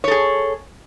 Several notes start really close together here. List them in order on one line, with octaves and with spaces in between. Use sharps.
C#5 A4 G#4